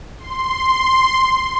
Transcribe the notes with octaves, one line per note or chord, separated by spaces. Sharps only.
C6